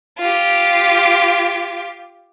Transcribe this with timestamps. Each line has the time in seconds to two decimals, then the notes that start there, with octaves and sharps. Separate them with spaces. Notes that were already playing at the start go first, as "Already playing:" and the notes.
0.18 F4 G4